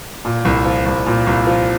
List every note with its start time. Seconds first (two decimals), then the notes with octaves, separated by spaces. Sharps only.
0.25 A#2
0.45 C2
0.65 F3
0.86 C2
1.06 A#2
1.27 C2
1.47 F3